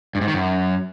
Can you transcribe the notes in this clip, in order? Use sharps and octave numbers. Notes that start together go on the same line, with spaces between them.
G2
G#2
D#3
F#2